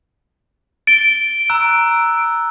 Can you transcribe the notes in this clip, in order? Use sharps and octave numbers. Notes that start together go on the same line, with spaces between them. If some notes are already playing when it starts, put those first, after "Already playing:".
A6 D7 G7
A#5 E6 F#6